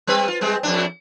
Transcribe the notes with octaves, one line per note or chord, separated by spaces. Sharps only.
G3 C4 B4
F4
G3 G#3 C4
F2 A2 D4